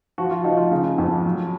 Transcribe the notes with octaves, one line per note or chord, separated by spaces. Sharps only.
F3 F#4
F4
F3 D#4
F4
C#3
F2
F#3